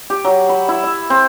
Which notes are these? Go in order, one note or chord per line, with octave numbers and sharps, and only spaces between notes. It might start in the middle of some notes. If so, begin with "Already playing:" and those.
G4
F#3
B5
E4
E5
C4